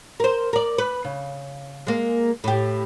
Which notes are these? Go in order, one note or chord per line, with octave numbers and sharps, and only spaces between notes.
A#4 C5
A#4 D5
B4
C#3
G#3 A#3
A2 G4